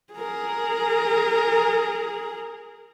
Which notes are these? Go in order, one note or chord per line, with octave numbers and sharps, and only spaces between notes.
G#4 A#4